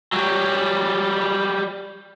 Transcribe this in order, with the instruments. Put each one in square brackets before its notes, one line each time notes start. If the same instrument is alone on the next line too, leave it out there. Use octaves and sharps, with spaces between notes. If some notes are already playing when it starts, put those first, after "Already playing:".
[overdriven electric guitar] F#3 G3